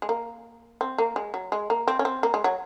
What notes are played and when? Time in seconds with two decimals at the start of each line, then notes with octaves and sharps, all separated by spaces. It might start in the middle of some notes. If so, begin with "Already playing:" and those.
0.02 G#3
0.09 A#3
0.81 C4
0.98 A#3
1.16 G#3
1.34 F#3
1.52 G#3
1.70 A#3
1.88 C4
1.99 C#4
2.05 C4
2.23 A#3
2.34 G#3
2.44 F#3